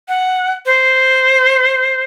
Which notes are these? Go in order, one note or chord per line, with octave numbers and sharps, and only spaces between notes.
F#5
C5